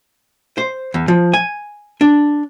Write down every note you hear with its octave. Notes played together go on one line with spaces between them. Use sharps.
C5
E2
F3
G#5
D4